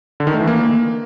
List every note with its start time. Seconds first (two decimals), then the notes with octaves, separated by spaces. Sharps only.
0.20 D3
0.27 D#3
0.34 A3
0.41 E3
0.47 A#3